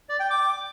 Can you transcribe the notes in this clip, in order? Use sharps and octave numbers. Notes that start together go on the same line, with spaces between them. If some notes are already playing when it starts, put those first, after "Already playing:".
D5
G5
D6